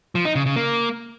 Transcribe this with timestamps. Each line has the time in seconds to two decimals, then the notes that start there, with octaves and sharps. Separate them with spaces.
0.15 F3
0.25 D#4
0.35 C#3
0.46 C#3
0.56 A#3